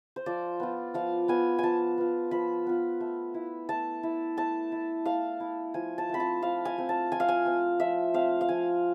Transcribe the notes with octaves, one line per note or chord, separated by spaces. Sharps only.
C5
F3 D5
B3 F4
F3 F5
B3 F4 G#5
F3 G#5 A5
B3 F4
F3 B5
B3 F4
A3
E4
A3 A5
E4
A3 A5
E4
A3 F5
E4
F3 G#5
A5
A3 C4 B5
A5
F3 F5
G#5
A3 C4
A5
F3 G#5
F5
G#5
A3 C4
F3 E5
A3 C4 F5
F5
F3 G#5